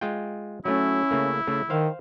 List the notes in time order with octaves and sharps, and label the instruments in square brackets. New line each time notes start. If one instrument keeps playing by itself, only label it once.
[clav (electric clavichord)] G#3 F4 G5
[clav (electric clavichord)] F#3 A3 [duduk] C#4 [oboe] E4
[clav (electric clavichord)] C#3 A3 A#3
C#3 A3
[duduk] D#3 [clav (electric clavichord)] C5 F5